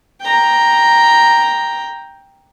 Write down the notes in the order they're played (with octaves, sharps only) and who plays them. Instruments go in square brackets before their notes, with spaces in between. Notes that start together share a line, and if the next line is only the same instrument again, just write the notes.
[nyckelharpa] G5 A#5